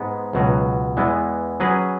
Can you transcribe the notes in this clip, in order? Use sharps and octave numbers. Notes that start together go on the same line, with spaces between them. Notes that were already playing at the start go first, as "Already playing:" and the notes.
Already playing: G#2 G#3 B3
C#2 B2 F#3
E2 E3 G#3 B3
F#3 C#4 G#4 B4